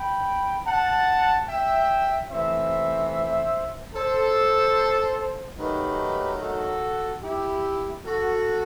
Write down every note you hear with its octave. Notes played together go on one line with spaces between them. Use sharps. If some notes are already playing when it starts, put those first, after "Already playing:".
Already playing: G5 B5
F#5 A5
E5 G5
C3 E3 A3 C5 E5
A4 C5
D#3 F#3 A3 D#4 G4 B4
F#4 A4
E4 G4
F#4 A4